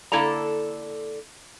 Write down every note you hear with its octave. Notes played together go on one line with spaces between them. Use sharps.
D3 A#3 E4 A4 D5 A#5